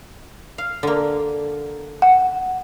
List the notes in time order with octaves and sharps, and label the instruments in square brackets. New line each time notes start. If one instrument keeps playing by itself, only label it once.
[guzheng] F5
D3 A#3
[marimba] F#5